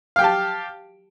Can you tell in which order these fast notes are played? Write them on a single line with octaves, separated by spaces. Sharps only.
F5 G5 G4 A5